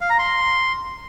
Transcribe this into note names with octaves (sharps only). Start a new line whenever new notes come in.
F5
A#5
C6